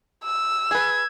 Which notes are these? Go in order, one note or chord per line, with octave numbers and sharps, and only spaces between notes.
E6
G#4 B4 G#6